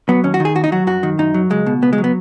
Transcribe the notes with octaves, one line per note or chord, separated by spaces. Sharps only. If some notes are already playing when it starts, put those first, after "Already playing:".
F#3 B3
D#2 C#4
F#4
D#3
G#4
D#2 F#4
D#4
F#3 F#4
F#2 F#4
D#3
F#2 D#4
F#3
C#2 G#3
B2
C#2 B3
G#3
F#3
B3